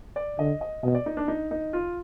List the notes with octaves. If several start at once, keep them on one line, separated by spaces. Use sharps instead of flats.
D5
D3 D#5
D#5
B2 D#5
D5
D#4
D4
D#4
D#4
F4